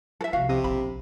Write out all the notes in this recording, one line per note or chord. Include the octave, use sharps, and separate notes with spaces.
A4 E5
C2 F3 F#4 F5
C3 D#5
A#1 B2 B5